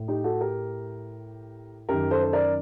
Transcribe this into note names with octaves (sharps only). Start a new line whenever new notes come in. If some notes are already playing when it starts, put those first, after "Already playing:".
Already playing: A2
D#4 G4
F#4 A4
G4 A#4
F#2 D#3 G4 A#4
A4 C5
C5
A#4 D5